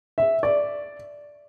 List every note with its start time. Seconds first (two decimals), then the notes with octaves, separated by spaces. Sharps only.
0.18 E5
0.43 D5